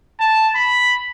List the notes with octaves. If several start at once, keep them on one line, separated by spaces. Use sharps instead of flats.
A5
B5